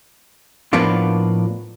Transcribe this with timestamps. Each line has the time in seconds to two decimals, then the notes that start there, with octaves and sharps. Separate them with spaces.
0.73 A2 F3 A#3 B3 D4 F4